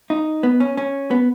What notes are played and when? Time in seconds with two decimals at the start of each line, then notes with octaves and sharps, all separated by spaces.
0.10 D#4
0.43 B3
0.60 C#4
0.77 C#4
1.11 B3